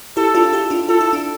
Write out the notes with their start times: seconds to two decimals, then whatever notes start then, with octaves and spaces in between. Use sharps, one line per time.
0.17 E4 G4 A4
0.35 D4 F4
0.53 E4 G4
0.70 D4 F4
0.89 F4 A4
1.01 E4
1.13 D4